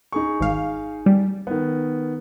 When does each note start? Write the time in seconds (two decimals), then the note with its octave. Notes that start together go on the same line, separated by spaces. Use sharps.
0.12 D#4 G#4 C#6
0.40 G#1 F5
1.06 G3
1.47 D#3 B3